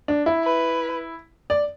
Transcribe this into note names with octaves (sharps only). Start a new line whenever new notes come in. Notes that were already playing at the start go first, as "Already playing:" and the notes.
D4
E4
B4
D5